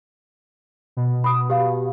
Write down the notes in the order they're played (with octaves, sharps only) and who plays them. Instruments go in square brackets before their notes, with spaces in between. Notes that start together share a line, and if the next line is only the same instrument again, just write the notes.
[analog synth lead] B2
[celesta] B5 D#6
G4 F5